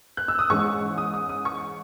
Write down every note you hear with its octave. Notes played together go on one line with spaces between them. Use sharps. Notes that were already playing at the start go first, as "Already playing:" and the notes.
F#6
E6
D#6
G#2 E3 G#3 C#4 C#6
D#6
D#6
D#6
C#6